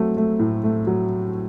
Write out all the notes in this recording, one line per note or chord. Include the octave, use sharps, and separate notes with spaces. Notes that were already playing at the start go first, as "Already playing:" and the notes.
Already playing: F#3 A3 C4
A3
A2
A3
F#3